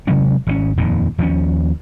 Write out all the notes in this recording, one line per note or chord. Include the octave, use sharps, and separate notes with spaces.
C3 F#3 G#3 C#4
G#1 E3 C#4
D#1 F2 A#2 D#3
D#2 F3 G3 C#4